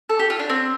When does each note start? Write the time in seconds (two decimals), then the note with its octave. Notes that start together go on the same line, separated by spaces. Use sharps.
0.09 A4
0.19 G4
0.30 F4
0.39 D4
0.50 C4